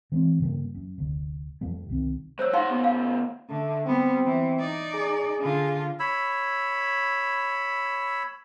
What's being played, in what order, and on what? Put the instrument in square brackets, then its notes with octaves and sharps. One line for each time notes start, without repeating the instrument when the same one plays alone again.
[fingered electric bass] E3 G#3 A#3 C4
G2 C#3 G3 A#3
F#2
F1 D2
F2 F3 G3 A3
C2 C3 D#3
[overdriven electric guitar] F#3 [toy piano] C5 C#5 E6
[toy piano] D#4 F5 C6 [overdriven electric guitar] G4 F#5
[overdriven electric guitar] D2 B3
[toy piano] F5
[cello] D3 [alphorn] A3
[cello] G3 B3 [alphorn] C4
[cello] E3
D#4 D5
[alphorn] G#4
[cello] D3 F4
[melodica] C#5 B5 E6